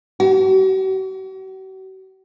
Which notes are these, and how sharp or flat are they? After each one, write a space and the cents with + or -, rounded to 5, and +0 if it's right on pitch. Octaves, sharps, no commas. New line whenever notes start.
F#4 +45